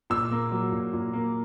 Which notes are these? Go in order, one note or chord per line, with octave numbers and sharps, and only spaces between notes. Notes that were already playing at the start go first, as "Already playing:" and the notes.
A#2 E6
A#3
F#3
A#2
A#2
A#3